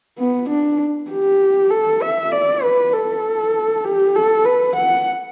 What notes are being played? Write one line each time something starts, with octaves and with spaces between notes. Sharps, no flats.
B3
D4
G4
A4
E5
D5
B4
A4
G4
A4
B4
F#5